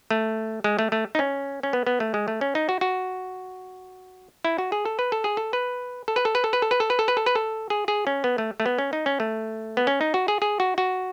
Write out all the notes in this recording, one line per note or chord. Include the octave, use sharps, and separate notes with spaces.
A3
G#3
A3
A3
D#4
C#4
C#4
B3
B3
A3
G#3
A3
C#4
D#4
F#4
F#4
E4
F#4
G#4
A4
B4
A4
G#4
A4
B4
A4
B4
A4
B4
A4
B4
A4
B4
A4
B4
A4
B4
A4
B4
A4
G#4
G#4
C#4
B3
A3
A3
B3
C#4
D#4
C#4
A3
B3
C#4
D#4
F#4
G#4
G#4
F#4
F#4